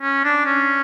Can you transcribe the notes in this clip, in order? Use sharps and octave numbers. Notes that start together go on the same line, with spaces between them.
C#4
D4
C#4